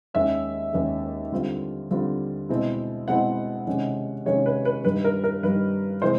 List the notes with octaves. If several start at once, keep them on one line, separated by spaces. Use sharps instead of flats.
D#2 D#3 G#3 C#4 E5
D#2 D#3 G#3 C#4
D3 G3 C4 F4
D3 G3 C4 F4
B2 G#3 C4 E4
B2 G#3 C4 E4 F#5
C3 D#3 G#3 C#4
C3 D#3 G#3 C#4 C#5
B4
B4
G2 D#3 G3 B4
A#4
A#4
G2 D#3 G3 B4
C3 E3 G#3 C5